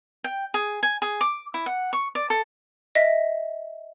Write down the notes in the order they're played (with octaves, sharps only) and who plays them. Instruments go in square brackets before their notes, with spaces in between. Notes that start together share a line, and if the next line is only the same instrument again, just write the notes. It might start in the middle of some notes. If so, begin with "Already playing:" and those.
[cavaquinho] G5
G#4
G#5
G#4
D6
E4
F#5
C#6
D5
A4
[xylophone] D#5 E5